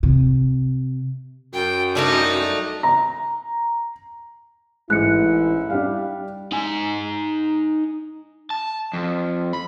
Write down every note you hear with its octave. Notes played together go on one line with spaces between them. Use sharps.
C3
F#2 G5
G3 A3 D4 D#4
A#5
A1 G#2 E4 F#6 C#7
G3 D4 G4 F5
D#4 G#5
A5
F2
B5